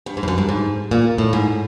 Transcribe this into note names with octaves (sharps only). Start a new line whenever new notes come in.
G2
G#2
G2
F#2
G2
G#2
A#2
A2
G#2